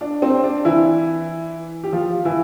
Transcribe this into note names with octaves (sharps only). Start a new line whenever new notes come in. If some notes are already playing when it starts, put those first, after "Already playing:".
D4
C4
D4
E3 E4
G4
F3 F4
E3 E4